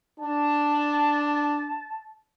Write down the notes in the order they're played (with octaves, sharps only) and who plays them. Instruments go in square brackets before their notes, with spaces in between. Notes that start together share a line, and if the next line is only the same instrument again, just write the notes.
[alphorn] D4 [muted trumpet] A5